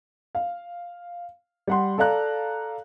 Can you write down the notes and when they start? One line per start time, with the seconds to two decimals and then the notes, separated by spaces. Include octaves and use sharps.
0.35 F5
1.67 G3 F#5 C6
1.98 A4 D5 F5 A#5 F#6